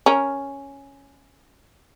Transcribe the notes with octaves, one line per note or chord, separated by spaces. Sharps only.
C#4 A#4